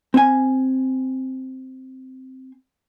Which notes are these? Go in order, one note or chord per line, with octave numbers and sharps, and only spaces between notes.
C4 G#5